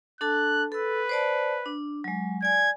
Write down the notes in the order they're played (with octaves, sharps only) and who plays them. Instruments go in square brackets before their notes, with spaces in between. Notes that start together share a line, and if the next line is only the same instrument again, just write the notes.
[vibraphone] D4 A4 A5 [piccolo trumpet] F#6
[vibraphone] A4 E6 [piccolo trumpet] B4
[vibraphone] C5 D5 A5
D4
F#3 G#3
[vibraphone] D5 G#5 [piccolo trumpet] G#6